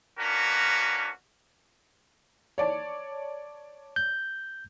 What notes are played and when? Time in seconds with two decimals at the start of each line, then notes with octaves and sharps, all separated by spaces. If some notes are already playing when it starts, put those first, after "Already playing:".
0.19 A#3 C#4 D4 F#4 A#4 B4
2.58 C#5 D5 A5
3.96 G6